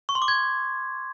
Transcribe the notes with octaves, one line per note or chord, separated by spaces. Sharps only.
C#6
C6
D6
G#6